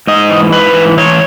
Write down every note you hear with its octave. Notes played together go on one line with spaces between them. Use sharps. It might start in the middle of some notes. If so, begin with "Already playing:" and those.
G#2 D#5
E3
G#2 B4
E3
E3 C#5